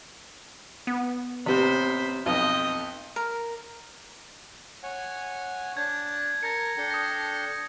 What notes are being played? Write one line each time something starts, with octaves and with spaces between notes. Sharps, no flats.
B3
A1 C3 C5 B5
B1 F2 D#5 G5
A#4
C#5 F#5 G#5
D4 A5 G6 G#6
A#4 A5 G#6 A#6 C#7
D4 A4 G5
D#6 A#6